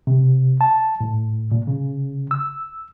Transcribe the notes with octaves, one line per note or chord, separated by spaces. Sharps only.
C3
A5
A2
A#2
C#3
E6